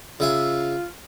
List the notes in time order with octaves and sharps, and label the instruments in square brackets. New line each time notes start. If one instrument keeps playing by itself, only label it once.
[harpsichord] C#3 E5 G#5 [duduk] F4